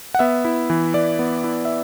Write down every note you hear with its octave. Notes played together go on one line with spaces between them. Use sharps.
F#5
B3 E5
E4
E3
E3 D5
B3
E4
E5